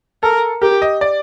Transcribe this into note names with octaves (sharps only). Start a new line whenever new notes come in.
A4 A#4
G4 A#4
D#5
D5